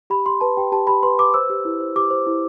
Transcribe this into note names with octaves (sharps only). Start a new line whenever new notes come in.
G4 B5
G4 C6
B4 A5
G4 G5
G4 A5
G4 B5
B4 C6
B4 D6
C5 E6
G4
E4
C5
G4 D6
C5
E4